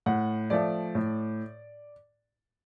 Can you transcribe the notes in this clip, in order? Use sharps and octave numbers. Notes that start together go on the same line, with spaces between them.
A2 F#5
F3 A3 D5
A2